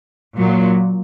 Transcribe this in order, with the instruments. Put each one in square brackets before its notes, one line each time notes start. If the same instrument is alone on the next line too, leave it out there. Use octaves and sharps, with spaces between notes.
[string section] A#2 F#3